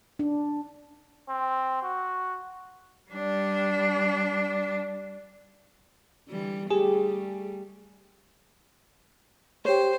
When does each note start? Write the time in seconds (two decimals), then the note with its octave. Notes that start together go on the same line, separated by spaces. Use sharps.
0.19 D4
1.29 C4
1.83 F#4
3.11 G3 D4
6.28 D3 E3 G3
6.70 G3 A3 G4 G#4
9.65 G4 C5 C#5